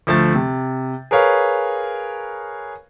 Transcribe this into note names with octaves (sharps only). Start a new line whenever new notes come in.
D2 F3 A3 A6
C3
G#4 A#4 B4 C#5 F5